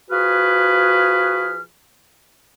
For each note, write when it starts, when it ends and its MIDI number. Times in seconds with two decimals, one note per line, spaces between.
0.11 1.61 53
0.11 1.61 66
0.11 1.61 68
0.11 1.61 71
0.11 1.61 89